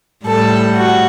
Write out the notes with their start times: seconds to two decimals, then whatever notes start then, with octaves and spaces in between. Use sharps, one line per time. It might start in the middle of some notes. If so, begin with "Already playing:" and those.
0.24 A2 G3 A4
0.76 F#4